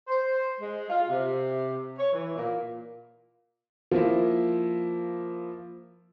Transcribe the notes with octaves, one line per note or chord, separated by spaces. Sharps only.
C5
G#3
F4
C3
C#5
E3
A#2
F3 A#3 E4